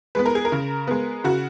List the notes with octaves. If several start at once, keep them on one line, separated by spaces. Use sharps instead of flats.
G#3 B3 B4
A#4
G#4
A#4
C#3
G#3 B3
C#3 F#4